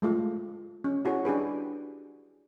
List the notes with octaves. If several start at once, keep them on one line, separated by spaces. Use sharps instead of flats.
G#3 A3 F4 A4
C#4
E4 F#4 G#4 C#5
D4 G4 G#4 B4